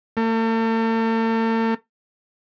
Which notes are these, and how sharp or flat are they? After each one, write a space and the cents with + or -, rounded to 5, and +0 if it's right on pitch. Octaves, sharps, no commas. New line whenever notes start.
A3 +45